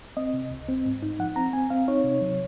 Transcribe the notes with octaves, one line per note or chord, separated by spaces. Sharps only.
C4 D#5
C3
C#2
C4
G#2
D#4
F3 F#5
C4 A#5
C4 G#5
C4 F5
D#4 C#5
C3
F#3